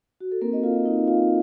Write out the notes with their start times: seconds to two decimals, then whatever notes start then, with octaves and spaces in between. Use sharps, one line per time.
0.21 F#4
0.32 A4
0.41 A#3 C4 D#4 F#4 A#4
0.53 D#5
0.63 F4 F5
0.85 D#4 D#5
1.07 F4 F5